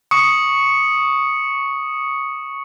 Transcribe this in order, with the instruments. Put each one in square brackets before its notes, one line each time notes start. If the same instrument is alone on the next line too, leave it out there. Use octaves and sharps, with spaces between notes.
[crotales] C#6 D#6 C#7